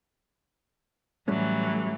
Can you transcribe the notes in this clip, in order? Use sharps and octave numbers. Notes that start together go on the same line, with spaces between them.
A2 E3 F#3 G3 A3 C#4